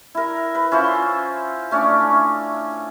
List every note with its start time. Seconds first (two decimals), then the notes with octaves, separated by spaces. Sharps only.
0.15 E4 A#4
0.55 B4
0.72 C#4 E4 F4 C5
1.71 A3 C#4 D4